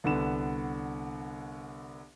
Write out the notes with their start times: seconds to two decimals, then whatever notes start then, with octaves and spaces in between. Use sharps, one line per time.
0.04 C2 D3 B3 E7